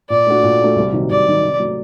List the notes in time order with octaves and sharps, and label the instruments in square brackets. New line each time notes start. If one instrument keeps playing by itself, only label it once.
[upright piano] A#2 [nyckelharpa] D5
[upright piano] A3 D4 F#4
A#2
A3 D4 F#4
C2
C3 D#3 F#3
[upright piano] C2 [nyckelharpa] D5
[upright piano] C3 D#3 F#3
C3
F#3 A3